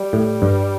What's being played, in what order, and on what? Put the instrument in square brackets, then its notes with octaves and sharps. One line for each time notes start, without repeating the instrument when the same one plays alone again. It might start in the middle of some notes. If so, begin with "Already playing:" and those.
Already playing: [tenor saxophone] G3
[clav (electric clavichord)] A2
G2